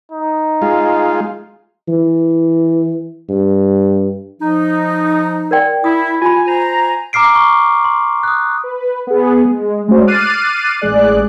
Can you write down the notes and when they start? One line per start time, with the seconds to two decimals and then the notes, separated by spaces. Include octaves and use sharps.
0.12 D#4
0.62 G#3 F4
1.89 E3
3.29 G2
4.40 F3 D#4
5.51 A#4 D5 G5
5.84 E4 D#6
6.22 F4 G#5 B5
6.47 C5 G#5 A#5
7.13 A#5 D6 F6 C7 D7
7.36 C#6
7.84 C6
8.23 D#6 F#6
8.64 B4
9.07 B3 G#4
9.45 G#3
9.88 G#3 A3 C#4 D4 F#4 C5
10.07 D6 F6 F#6 A6 C7 D#7
10.81 A1 G#3 G#4 D5 F#6